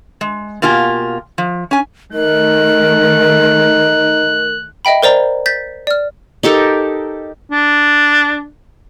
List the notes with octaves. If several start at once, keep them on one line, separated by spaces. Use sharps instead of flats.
G#3
B2 A#3 F4 G4 G#5
F3
C#4 G#5
D#3 A3 D#4 A#4 F#6
D#5 E5 G5 B5
A#4 C5 D5 A#5
G6 A6 B6
D5 F6
D#4 G4 A4 A#4
D4